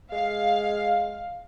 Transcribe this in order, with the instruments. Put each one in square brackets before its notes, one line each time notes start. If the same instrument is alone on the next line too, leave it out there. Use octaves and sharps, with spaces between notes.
[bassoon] G#3 [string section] F5